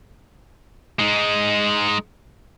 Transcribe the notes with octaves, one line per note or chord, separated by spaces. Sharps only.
G#3 D#4